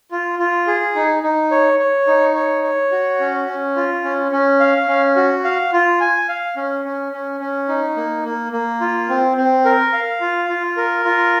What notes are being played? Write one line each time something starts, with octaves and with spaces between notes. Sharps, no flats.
F4
F4
G#4
D#4
D#4
C#5
C#5
D#4
C#5
C#5
F#4
C#4
C#4
F4
C#4
C#4
F5
C#4
F#4
F5
F4
G#5
F5
C#4
C#4
C#4
C#4
D#4
A#3
A#3
A#3
F4
C4
C4
A#4
F5
F4
F4
A#4
F4